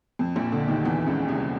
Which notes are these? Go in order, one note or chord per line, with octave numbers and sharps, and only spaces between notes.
F2
A#1 A#2
D2 D3
D#2 D#3
E2 E3
C#2 C#3
C2 C3